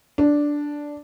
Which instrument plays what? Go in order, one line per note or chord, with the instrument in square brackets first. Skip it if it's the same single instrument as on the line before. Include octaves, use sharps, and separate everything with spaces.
[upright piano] D4